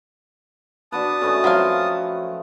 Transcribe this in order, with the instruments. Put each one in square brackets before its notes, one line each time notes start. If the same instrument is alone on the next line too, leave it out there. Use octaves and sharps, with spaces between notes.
[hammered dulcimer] D4 F#4 B4 [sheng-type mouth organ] A5 D#6
[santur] A3 G#5 [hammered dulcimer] C#4 B4 D#5
[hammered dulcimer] F3 [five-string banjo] F#3 C4 F5